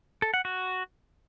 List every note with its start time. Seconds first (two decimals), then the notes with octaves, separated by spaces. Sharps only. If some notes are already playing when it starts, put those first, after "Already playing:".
0.22 A4
0.34 F#5
0.45 F#4